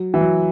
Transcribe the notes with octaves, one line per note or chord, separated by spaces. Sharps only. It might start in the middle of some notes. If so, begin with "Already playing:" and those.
Already playing: F#3
E3
F#3